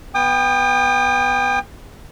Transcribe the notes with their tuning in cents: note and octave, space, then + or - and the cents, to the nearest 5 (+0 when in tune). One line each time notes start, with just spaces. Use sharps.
B3 +0 G5 +30 D#6 -35